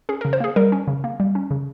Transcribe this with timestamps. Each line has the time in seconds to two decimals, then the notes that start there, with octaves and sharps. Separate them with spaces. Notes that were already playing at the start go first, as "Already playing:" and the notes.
0.09 C#4 G#4
0.21 A#4
0.25 C#3
0.33 C5
0.40 A#3 G#4
0.56 G3 A#4
0.72 C#4
0.88 C#3
1.04 A#3
1.20 G3
1.35 C#4
1.51 C#3